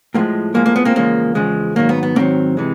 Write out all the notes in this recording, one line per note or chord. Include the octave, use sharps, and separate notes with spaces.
A2 F3 G#3 A#3
A2 F3 G#3 A#3
A#3
B3
A#3 C4
E2 C#3 F3 G#3 A#3
E2 C#3 F3 G#3
G#2 D#3 F#3 A#3
B3
B3
G#2 D#3 F#3 A#3 C4
C3 E3 G#3